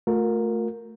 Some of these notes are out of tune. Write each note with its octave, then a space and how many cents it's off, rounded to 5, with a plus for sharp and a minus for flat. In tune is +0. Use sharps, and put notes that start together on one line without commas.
A3 +0 F4 +45 A#4 +0